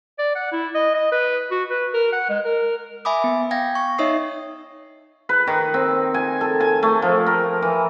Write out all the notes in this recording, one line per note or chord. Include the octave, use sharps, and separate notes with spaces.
D5
F#5
E4
D#5
D#5
B4
F#4
B4
A#4
F#5
G#3
A#4
E5 G#5 B5 D6 D#6
B3
F5 G5 G#6 A#6
C#6
D#4 C#5 D#5 E5 D#6 C7
B4
D#3
C4
G#5
A4
G#5
A3
F3
A#4
E3